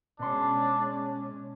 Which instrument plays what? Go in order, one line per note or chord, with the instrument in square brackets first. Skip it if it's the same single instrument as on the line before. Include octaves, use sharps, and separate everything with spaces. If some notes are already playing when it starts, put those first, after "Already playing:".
[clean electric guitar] B2 C6 [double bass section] G#3 C#4 [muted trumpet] D4